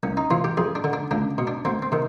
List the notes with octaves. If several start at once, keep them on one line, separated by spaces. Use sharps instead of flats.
C2 C#4
D#4
C3 E3 F4
G4
F2 G#4
D4
D3
D4
C#2 D4
B2
D4
D2 C4
C4
C3 D#3